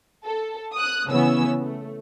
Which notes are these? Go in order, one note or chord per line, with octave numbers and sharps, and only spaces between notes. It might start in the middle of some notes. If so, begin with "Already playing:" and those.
A4
D#6 F#6
C#3 E3 B3 C#4 E6
A3